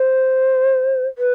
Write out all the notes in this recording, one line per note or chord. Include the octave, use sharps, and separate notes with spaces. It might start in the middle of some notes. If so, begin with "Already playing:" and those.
Already playing: C5
B4